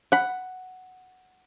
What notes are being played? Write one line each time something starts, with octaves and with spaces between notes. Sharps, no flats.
F#5 B5